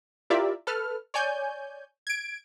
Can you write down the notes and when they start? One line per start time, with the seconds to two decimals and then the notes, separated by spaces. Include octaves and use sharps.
0.30 E4 F4 G4 A#4 D5 E5
0.67 A4 B4 F6
1.14 C#5 D5 G#5 G6
2.07 G#6 D7